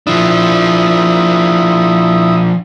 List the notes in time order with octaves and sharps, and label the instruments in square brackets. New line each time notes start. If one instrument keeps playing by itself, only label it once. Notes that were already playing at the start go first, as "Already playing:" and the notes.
[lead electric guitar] F3 D4 [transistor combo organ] E4 D#6